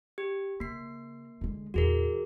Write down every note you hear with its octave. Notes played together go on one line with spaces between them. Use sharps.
G4
C#3 A#3 C7
D3 G#3
E2 A#2 F#4 G#4 A#4